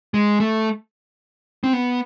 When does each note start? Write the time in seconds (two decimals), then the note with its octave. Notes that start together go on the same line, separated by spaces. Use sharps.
0.14 G#3
0.40 A3
1.64 C4
1.73 B3